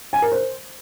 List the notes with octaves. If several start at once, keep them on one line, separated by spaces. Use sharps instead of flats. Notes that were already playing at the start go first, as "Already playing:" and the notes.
G#5
A#4
C5